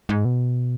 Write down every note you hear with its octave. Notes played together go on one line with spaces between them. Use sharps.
G#2
B2